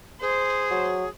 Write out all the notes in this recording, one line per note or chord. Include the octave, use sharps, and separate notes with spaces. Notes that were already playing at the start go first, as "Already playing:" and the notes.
G#4 C5
F#3